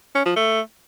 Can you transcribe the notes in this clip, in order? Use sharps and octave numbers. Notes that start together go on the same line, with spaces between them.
C#4
F3
A3